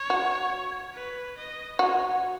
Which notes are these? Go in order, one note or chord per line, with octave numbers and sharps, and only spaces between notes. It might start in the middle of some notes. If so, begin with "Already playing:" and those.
Already playing: C#5
F#4
B4
D#5
F#4 C#5